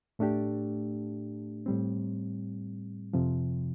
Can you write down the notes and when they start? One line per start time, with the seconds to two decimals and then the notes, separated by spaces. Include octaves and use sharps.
0.19 A2 A3 D4 G4
1.66 A2 G3 C4
3.13 F2 C3 F3